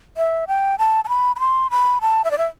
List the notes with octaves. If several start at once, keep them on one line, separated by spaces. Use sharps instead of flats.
E5
G5
A5
A5
B5
B5
C6
B5
A5
E5
D5
E5